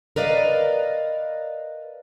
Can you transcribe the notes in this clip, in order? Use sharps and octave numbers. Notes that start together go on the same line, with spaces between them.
A#4 B4 D5 D#5 F5